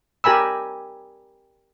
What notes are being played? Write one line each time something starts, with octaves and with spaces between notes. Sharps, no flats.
G4 A#4 G#5 B5 E6